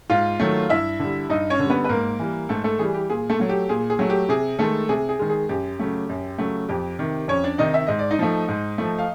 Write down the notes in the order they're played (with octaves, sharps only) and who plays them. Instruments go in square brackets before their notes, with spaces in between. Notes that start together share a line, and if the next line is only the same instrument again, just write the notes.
[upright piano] G#2 F4 F5
D#3 F#3 A3
G2 E4 E5
D3 G3
G2 D#4 D#5
C#4 C#5
D3 G3
B3 B4
B4
G#2 A#3 A#4
E3 G3
G#2 A3 A4
A3 A4
E3 G3 G#4
G4
A#2 G#4
A3 A4
F#3 A3
G4
A#2 G#4
G#4
F#3 A3
G4
C3 G#4
D#3 G#3 A3 A4
C3 G#4
G#4
D#3 G#3
G#4
F#2 G4
C#3 F#3 A3
F#2
C#3 F#3 A3
F2 G4
C3 D#3
F2 C#4 C#5
D4 D5
C3 D#3 D#4 D#5
E5
G#2 D#5
D5
D#4 D#5
F3 A3
G#2
F3 A3
F5